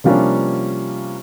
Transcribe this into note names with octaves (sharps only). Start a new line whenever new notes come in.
C3 F3 G3 A#3 C#4 D4